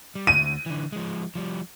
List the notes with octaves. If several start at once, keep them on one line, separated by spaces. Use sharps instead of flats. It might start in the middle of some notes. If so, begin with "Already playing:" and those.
G3
D2 D#7
D3 E3
F3 G#3
F3 G3